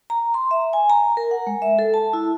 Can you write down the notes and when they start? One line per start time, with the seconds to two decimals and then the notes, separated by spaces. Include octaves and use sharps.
0.10 A#5
0.34 C6
0.51 E5
0.73 G#5
0.90 A#5
1.17 A#4
1.31 F#5
1.47 G#3
1.62 E5
1.79 A4
1.94 A5
2.13 E4